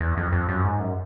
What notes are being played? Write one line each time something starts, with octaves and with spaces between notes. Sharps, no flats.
E2
F2
F2
F#2
G#2
F#2